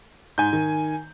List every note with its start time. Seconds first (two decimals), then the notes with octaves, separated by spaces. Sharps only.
0.38 G#2 G#5 G6
0.53 D#3